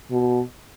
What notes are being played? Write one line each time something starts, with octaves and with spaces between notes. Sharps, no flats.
B2